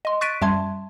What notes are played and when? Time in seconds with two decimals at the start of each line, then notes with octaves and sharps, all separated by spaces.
0.05 D#5 C6
0.21 C#6 F#6 A6 B6 D7 D#7
0.41 F#2 G3 E5 A5 C6 G#6